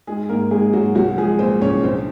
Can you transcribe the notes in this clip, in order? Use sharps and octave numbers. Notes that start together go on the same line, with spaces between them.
G#2 G#3 G#4
G#1 A#3 A#4
G#1 G#3 G#4
G#1 F#3 F#4
C2 F#3 F#4
F3 G#3 G#4
A#2 C4 C5
C2 C#4 C#5
A#1 C4 C5